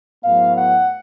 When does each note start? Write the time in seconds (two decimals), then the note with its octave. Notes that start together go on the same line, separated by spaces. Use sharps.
0.23 A2 F#3 B3 F5
0.57 F#5